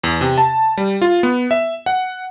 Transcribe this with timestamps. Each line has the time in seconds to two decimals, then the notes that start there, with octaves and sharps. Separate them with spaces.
0.04 E2
0.21 C3
0.38 A5
0.77 G3
1.02 F4
1.23 B3
1.51 E5
1.86 F#5